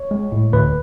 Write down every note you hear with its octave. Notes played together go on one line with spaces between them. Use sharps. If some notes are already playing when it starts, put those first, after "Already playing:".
Already playing: C#5
G#3
A2
D2 B4